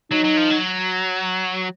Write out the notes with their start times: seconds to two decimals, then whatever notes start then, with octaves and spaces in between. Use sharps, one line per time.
0.11 F#3 D#4
0.24 F#3
0.37 F3
0.51 F#3